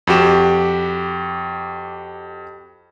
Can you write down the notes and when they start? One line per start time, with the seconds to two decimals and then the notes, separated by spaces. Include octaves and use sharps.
0.07 F2 F#4 G4 E7